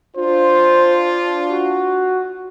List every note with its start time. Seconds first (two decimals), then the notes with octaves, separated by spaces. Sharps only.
0.17 D4 F4 C5
1.48 F#4